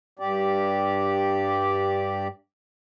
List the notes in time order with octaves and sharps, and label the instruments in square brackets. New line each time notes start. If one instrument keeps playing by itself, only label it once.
[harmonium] G2 G4 D5